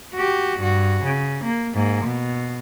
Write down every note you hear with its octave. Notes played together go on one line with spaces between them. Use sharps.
F#4 G4
G2 F#4
C#3
A#3
G#2 A#3
B2